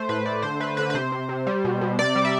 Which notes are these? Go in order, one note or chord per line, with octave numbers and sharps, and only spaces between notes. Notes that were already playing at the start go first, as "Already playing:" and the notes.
Already playing: A3 C5
A2 B4
A3 D5
D3 C5
A3 B4
D3 B4
B4
C3 C5
C3
C3
G3
B2
B2
C3 D5
G3
E5